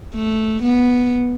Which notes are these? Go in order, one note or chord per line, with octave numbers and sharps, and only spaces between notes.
A3
B3